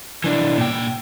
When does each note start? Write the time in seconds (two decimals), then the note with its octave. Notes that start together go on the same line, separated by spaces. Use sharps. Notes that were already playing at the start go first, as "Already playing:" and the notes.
0.24 E3 D4
0.57 A#2 G5